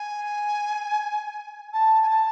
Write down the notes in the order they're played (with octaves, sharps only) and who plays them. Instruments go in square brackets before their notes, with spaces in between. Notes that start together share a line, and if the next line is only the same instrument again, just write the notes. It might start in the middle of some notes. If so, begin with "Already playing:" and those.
Already playing: [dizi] G#5
A5
G#5
A5